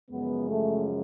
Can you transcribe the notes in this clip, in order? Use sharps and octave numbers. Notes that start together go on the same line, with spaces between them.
F#2 C#3 F3 G#3 B3
A3